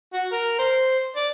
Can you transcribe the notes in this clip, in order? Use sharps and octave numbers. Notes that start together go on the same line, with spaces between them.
F#4
A#4
C5
D5